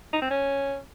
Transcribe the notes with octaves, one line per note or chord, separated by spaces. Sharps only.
D#4
C4
C#4